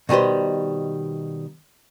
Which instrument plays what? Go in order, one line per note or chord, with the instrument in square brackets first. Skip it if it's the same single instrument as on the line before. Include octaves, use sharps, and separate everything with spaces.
[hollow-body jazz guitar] B2 D#3 G3 B4 C5